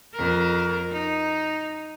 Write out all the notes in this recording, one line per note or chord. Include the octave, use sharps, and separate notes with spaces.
F2 A#4
D#4